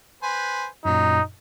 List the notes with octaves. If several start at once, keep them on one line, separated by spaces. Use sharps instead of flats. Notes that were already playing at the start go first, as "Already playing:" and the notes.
B4 C5 G#5
F#2 A#2 F#3 D#4